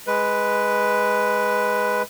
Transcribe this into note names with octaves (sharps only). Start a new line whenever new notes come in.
G#3 B4